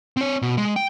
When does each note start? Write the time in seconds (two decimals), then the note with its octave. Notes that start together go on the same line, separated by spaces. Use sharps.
0.17 C4 C#5
0.42 B2
0.57 G#3
0.76 G5